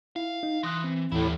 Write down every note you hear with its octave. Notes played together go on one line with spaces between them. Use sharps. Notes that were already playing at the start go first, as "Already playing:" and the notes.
E4 F5
D#4
E3 C6 D#6 F#6
C4
D#2 A2 E3 G3 E4